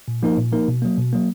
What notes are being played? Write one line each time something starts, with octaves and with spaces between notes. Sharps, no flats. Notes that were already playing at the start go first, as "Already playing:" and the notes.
A#2
F3 A#3 D#4 A#4
A#2
F3 A#3 D#4 A#4
B2
F#3 A#3
B2
F#3 A#3